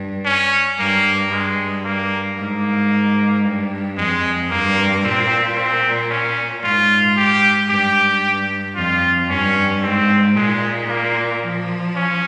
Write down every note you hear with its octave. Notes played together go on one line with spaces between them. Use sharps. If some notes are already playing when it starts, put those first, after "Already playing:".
Already playing: G2
C#4
G2 A#3
G2 G#3
A#3
G#2 A#3
G2
F2 G#3
G2 A#3
A#2 C4
C4
C#4
G#2 F4
G4
G2 G4
F2 F4
G2 C#4
G#2 C4
A#2 G#3
A#3
F3
C#4